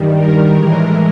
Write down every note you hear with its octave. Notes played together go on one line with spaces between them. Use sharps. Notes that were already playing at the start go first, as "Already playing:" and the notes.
Already playing: G2 D#3 G3
A#4
A2 E3 G#3